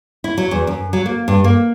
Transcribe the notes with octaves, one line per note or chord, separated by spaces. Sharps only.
E4
F#3
E2
F#2
F#3
A#3
G2
A#3